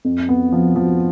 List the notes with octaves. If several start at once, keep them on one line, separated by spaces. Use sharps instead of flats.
F2
B3
F3
F3